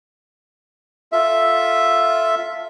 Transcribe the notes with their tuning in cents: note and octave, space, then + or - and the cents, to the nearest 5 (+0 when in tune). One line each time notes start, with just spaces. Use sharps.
F4 +0 A4 +0 E5 +0